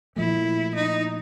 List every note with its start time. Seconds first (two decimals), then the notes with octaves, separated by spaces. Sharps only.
0.16 A#2 F3 A3 E4
0.75 D#4